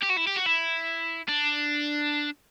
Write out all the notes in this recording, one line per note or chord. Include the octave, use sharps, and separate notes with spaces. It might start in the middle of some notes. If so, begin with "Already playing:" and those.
G4
F#4
E4
G4
F#4
E4
D4